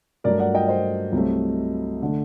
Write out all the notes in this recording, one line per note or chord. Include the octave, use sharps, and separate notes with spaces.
G2 F#3 A3 A#4 D5
D5 F#5
D#5 G5
C5 D#5
C2 C3 F#3 A3
D3 A3